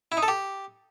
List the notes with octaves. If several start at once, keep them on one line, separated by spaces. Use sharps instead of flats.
E4
D#4
A4
G4